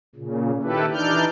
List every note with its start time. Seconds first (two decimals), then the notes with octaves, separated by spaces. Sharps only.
0.15 A#2 C#3
0.63 D#3 E4 G4 A4 B4
0.94 E3 D4 D#4 D5 F6 G6